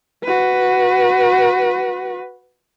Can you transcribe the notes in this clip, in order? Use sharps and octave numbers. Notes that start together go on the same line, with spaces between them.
F#4 B4